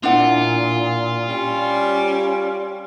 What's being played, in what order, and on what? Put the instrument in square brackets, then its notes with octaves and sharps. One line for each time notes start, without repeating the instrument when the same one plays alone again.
[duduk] A#2 [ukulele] D4 E4 F#5 [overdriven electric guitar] F4
[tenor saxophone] G3 [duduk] C#4